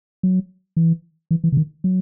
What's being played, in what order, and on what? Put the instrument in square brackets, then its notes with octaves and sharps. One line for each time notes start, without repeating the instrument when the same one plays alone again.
[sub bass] F#3
E3
E3
E3
C#3
D#3
F#3